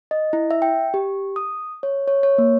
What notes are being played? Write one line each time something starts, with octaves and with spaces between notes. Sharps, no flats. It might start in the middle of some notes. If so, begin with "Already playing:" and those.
D#5
E4
E5
G5
G4
D#6
C#5
C#5
C#5
A#3